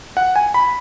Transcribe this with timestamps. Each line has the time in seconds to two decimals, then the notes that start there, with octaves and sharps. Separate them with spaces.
0.17 F#5
0.36 G#5
0.54 B5